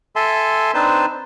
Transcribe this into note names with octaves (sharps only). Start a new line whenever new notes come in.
A4 E5 G#5 A5 C6
C4 D4 D#4 B4 C5 A5